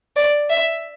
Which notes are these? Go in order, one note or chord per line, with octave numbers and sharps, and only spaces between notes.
D5
E5